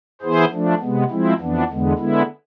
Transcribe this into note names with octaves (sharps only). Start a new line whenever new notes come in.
E3 B3 E4 G#4 C5
F3 A3 D4
C3 G#3 B3
F3 G#3 C4 E4
F2 E3 B3 D4
E2 D3 G#3 B3
D3 G#3 B3 E4